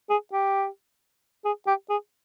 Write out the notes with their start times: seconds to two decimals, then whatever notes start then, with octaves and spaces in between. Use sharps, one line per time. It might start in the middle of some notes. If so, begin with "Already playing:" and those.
0.10 G#4
0.33 G4
1.45 G#4
1.67 G4
1.90 G#4